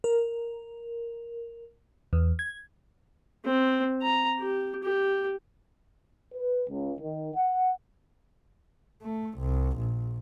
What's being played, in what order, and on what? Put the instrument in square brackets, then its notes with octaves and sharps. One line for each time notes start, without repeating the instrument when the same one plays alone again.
[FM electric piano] A#4
E2
G#6
[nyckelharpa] C4
A#5
G4
G4
[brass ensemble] B4
C#2
D#3
F#5
[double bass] A3
C2
A#1